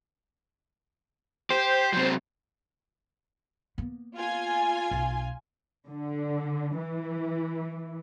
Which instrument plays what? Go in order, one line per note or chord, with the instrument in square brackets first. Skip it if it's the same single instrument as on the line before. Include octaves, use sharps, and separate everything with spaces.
[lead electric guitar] G4 [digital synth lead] C5
[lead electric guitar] C3 F#3
[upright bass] A#3 B3
[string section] F4 G#5
[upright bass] B1
[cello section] D3
E3